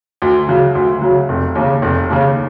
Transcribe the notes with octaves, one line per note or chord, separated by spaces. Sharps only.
D2
C#3 F#3
D2
C#3 F#3
F1
D#2 C#3
F1
D#2 C#3